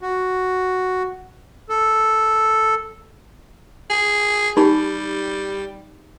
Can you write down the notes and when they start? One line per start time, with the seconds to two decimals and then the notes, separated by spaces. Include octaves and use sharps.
0.01 F#4
1.69 A4
3.90 G#4
4.57 G3 D#4 G4 B5